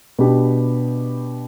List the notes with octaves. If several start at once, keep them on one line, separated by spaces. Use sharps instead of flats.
B2 B3 D4 G4